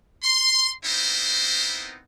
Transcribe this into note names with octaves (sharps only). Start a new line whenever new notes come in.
C6
B3 C4 D#4 E4 A#4 C5